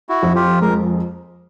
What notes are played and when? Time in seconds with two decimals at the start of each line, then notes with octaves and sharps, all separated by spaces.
0.09 E4 F#4
0.23 F2
0.35 F4 G4
0.61 G#3 A#4